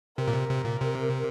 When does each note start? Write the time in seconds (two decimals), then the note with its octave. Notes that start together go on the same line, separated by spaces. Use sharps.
0.18 C3 A#4
0.28 A#2
0.34 C3
0.50 C3
0.65 A#2
0.81 C3